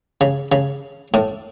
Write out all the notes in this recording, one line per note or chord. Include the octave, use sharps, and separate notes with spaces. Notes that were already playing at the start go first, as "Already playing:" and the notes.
C#3
C#3
A2